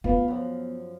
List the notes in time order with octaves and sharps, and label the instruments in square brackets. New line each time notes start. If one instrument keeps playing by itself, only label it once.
[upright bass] B3 [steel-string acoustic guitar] F4 B4
[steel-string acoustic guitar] F#2 F3